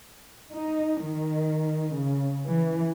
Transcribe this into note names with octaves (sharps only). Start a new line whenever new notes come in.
D#4
D#3
C#3
E3